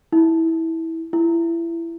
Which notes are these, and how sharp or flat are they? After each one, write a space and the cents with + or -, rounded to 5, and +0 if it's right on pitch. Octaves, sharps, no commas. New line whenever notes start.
E4 -20
E4 +25